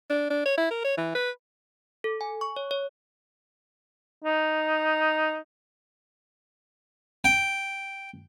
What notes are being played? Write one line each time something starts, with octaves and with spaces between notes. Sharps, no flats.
D4
D4
C#5
E4
A#4
C#5
E3
B4
A4
G#5
C#6
C#5
C#5
D#4
G5